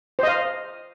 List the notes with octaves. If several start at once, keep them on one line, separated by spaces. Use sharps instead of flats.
C5 D#5 F5